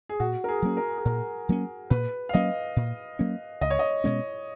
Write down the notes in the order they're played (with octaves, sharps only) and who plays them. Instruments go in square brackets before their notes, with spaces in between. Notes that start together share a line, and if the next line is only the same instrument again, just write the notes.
[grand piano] G#4
[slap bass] A#2 [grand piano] F#4
[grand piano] A#4
G#4
[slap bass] F#3 A#3 C#4
[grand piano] A#4
G#4
[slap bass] A#2 [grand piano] A#4
[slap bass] F#3 A#3 C#4
[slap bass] A#2 [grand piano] B4
[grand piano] F5
[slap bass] F#3 A#3 C#4 [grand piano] D#5
[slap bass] A#2
F#3 A#3 C#4
[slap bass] C#2 [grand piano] D#5
[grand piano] C#5
D#5
[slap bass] B2 G#3 C#4 [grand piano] C#5